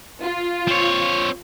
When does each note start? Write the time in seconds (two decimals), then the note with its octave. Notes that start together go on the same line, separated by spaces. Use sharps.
0.22 F4
0.68 C4 C#5